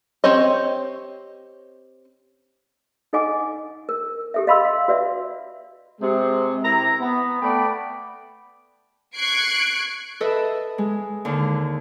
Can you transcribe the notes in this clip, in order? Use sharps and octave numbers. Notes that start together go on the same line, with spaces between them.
C4 G4 C#5 D#5
D#4 A4 D#5 F#5 G#5 D6
A#4
G4 A4 E5
D#5 F5 B5 C6 E6
F5
F#4 B4 D5 E5
C3 G#3
C3 E4 A#5
B3
A3 D5 F#5 G5 B5
C#6 F#6 G#6 C7 D7
A4 B4 D#5 E5
G#3
D#2 D3